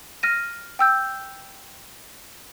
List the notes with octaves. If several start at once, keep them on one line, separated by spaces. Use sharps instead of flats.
F6 A#6 D#7
G5 E6 G6